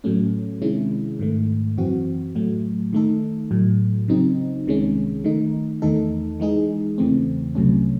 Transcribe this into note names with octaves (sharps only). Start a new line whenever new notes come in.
A2 F#3 A3 C#4
C3 D#3 G#3 C#4 E4
G#2 D#3 A3
F#2 E3 C4 F#4
A2 F#3 A3
D#3 A3 D#4 A4
A2 F#3 A3
C#3 F#3 C4 D#4
C2 C3 D#3 G#3 C#4
D#3 A3 D#4
E2 D#3 A3 D#4 A4
E3 G#3 D#4 G#4
E2 C#3 E3 A3 C4
C2 C3 F#3 A3 C#4